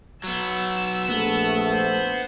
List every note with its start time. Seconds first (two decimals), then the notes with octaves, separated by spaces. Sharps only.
0.24 F#3 B3 E6
1.08 A#1 A3 B3
1.71 C5